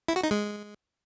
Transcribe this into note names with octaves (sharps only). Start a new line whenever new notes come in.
E4
F#4
D#4
G#3